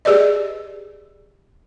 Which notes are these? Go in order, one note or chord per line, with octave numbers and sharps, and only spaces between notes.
G4 G#4 B4 D5 D#5